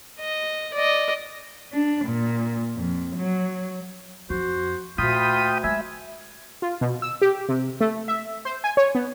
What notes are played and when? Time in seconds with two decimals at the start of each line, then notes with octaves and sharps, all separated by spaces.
0.19 D#5
0.74 D5 D#5
1.72 D4
2.05 A#2
2.75 F2
3.16 F#3
4.30 F2 F#4 C5
4.98 D2 A#2 F4 G5 B5 D#6
5.64 G#3 E5 G#5 B5
6.62 F4
6.81 B2
7.02 E6
7.22 G4
7.49 C3
7.80 A3
8.08 E5
8.45 C5
8.64 G#5
8.77 C#5
8.95 B3